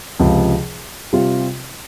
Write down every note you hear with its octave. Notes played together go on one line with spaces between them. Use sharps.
C#2 C3 F3
C3 G3 C4 F4